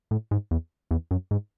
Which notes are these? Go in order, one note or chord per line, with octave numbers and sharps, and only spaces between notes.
A2
G#2
E2
E2
F#2
G#2